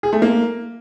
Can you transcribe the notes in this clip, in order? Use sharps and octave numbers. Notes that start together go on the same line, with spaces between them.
G#4
A3
A#3